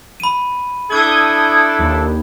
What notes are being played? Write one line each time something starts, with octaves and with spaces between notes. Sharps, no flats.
B5 D#7
D4 E4 A4 D#6 G6 G#6
D#2